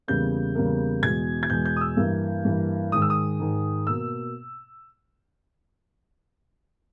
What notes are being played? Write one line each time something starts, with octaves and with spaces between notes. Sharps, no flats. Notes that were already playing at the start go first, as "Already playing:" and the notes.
E2 C#3 G3 A#3 G6
E2 C#3 G3 A#3
E2 B2 G#3 G#6
G#6
E2 B2 G#3 G6
G6
D#6
E6
G2 E3 A#3
G2 E3 A#3
G#2 D#3 G#3 D#6
E6
D#6
G#2 D#3 G#3
B2 A#3 E6